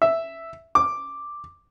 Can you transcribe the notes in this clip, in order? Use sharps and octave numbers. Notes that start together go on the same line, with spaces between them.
E5
D6